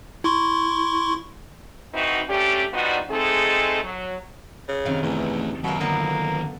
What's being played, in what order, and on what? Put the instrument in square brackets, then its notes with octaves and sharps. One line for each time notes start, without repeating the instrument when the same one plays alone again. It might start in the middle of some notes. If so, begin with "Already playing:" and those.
[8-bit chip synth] E4 C6 C#6
[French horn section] E3 C4 D#4 E4 F#4
G3 A3 C#4 D4 G4
F3 G3 B3 D4 D#4 F#4
G#3 A3 C4 D#4 G#4 A4
F#3
[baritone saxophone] C#3
[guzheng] F#2 C3 D#3 [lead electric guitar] F5
[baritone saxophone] E2 [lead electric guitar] E3 A3
[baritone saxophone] B2 [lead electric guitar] D#3 F#3 [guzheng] A#3 E5
[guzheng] D3 B3 A4 [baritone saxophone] A#3